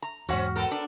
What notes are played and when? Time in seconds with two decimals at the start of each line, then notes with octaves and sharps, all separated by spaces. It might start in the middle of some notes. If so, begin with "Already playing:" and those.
0.02 A#5
0.29 E2 G#2 C4 C#4 F#4 F#5
0.56 B3 A4 A#4
0.71 D4